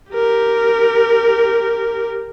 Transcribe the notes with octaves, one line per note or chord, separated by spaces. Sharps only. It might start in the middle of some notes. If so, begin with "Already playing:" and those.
G4 A#4